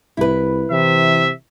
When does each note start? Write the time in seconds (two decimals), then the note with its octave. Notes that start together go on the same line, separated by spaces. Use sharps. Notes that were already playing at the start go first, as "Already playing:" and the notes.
0.17 C2 E4 B4
0.71 C3 E3 E5